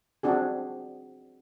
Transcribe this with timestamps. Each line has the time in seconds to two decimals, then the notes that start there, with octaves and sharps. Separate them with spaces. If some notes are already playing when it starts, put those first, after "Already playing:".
0.23 C4 D4 F#4 G#4